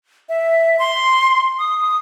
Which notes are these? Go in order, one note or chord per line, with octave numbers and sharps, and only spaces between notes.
E5
C6
D#6